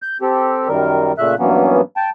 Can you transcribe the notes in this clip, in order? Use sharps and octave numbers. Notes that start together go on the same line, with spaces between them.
G6
C4 G4 A4
F#2 D#3 G3 A#4
A#2 C#3 A3 E5 F#6
G2 E3 F#3 A#3 B3 C#4
G5 A5